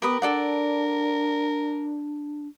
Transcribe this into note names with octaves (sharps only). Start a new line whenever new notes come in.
B3 G4 A#4 B4 D#6
D4 A4 D5 F#5